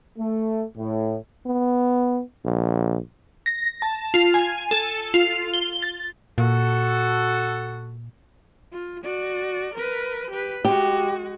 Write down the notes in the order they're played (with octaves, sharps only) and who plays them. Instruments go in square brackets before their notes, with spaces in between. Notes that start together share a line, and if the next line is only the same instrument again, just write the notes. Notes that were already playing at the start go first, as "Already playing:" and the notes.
[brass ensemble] A3
A2
[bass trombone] B3
A#1
[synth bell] A#6
A5
F4
G#5
A4
F4
G7
A6
[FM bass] A#2 [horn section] F#4 A4
[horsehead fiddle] F4
F#4 D5
A#4 B4
G4 B4
[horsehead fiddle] G#3 F#4 [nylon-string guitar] G4